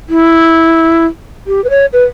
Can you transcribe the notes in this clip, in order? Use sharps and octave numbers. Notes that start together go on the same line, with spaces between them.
E4
G4
B4
C#5
B4